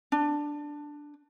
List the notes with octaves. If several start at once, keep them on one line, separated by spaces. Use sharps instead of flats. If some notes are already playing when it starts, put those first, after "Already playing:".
D4